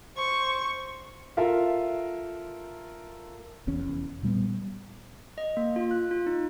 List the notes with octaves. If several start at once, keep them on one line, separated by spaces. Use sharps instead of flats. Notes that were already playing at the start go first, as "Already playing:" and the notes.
C5 C#6
F4 A4 A#4 E5 F5
F1 E2 C#4
A#2 G3 G#3 B3
D#5
A#3
F4
F#6
F4
D#4